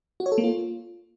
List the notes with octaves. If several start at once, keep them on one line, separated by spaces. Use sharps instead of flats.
F#4
C#5
A4
A#3
F4